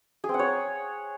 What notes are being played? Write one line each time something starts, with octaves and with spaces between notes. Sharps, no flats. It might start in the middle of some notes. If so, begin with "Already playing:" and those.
G#4
C4
F#5
C#5